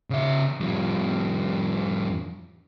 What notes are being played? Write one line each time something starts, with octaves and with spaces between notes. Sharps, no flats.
C#3 E5
F2 G3